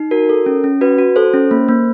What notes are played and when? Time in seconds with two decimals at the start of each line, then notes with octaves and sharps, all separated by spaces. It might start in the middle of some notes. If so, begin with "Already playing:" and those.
Already playing: D#4
0.11 F#4 A#4
0.29 A4
0.46 C#4
0.64 C#4
0.81 F#4 B4
0.98 F#4
1.16 A4 C5
1.34 C#4
1.51 A#3
1.68 A#3